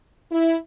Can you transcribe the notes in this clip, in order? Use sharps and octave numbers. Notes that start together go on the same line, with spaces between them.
E4